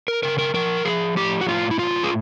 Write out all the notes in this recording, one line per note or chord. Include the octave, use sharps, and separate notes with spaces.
A#4
C#3 A#4
A#4
F3 A#4
F3 G#4
A2 G4
F#4
A2 F4
E4
F#3 F4
G#4